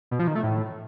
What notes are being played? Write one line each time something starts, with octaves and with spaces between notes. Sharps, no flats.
B2
F3
D#3
A3
A2